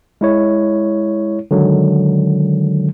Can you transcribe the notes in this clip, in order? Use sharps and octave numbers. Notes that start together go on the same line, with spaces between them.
G#3 E4 C#5
D3 D#3 F#3 G#3